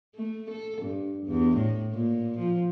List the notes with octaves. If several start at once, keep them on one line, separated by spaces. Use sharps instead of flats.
A3
A4
G2
E2
A2
A#2
F3